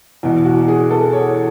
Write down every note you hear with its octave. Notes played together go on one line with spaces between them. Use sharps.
E2 B2
F#4
G#4
A4
C#5